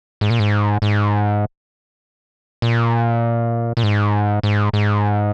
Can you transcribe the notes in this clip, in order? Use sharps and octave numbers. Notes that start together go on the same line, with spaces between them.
G#2
A#2
G#2
G#2
A#2
A#2
G#2
G#2
G#2